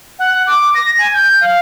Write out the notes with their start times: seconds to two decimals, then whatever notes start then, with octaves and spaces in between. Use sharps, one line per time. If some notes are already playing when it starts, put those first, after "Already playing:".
0.19 F#5
0.47 D6
0.75 A#6
0.98 G#5
1.14 G6
1.41 F5